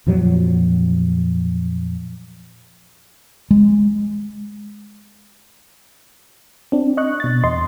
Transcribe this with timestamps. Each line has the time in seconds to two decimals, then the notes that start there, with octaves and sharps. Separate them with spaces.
0.06 F2 A#2 F3 F#3
3.51 G#3
6.72 C4 D4
6.97 D#5 C#6 F#6
7.20 B2 A6
7.44 E2 D#5 C6